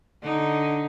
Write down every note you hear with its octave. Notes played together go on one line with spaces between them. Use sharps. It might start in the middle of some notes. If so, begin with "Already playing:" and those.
D3 D#4